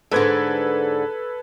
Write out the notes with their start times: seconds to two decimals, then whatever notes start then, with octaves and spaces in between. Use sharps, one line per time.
0.11 G#2 D3 A4 B4 G#6